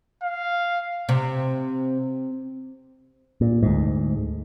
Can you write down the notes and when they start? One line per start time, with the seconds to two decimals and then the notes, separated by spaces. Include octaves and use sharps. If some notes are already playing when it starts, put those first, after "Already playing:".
0.23 F5
1.09 C3
3.41 A#2
3.63 D2 G#2